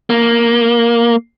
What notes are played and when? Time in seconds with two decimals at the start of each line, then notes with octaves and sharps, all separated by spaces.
0.10 A#3